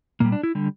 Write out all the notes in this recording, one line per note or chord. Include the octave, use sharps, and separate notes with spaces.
A#2 G3 A#3
D4
E4
D3 G3